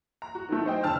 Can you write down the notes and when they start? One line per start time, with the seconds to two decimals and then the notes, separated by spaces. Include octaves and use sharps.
0.22 A#5
0.35 F#4
0.49 D#3 F#3 A3
0.66 C5 D#5 G5
0.83 F1 D3 A5 E6 F6